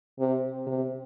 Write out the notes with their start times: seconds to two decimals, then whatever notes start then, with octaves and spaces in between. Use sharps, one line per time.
0.19 C3
0.67 C3